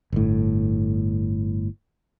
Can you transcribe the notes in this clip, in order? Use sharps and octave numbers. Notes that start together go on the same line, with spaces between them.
G1 A2